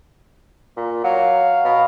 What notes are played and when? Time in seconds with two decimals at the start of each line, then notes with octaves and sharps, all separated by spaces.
0.76 A#2
1.04 F#3 F5
1.65 B2 F5